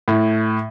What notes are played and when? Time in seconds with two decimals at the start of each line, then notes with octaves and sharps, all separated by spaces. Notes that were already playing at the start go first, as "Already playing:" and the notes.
0.08 A2